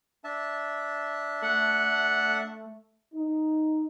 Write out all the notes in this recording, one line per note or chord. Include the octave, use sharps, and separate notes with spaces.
D4 E5 A5
A3 F#5
D#4